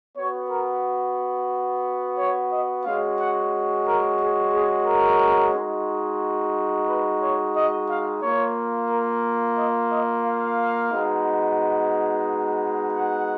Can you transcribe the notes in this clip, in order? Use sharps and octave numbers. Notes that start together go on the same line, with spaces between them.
B3 F#4 C#5
A#4
C#5
D#5
G#3 C#4 F#4 F5
F#5
A#4
G#4
G#4
A#4
G#3 D#4 F#4
B4
C#5
D#5
F5
A#3 F4 C#5
A#4
D#5
D#5
F5
G#3 B3 D#4 F#4
F#5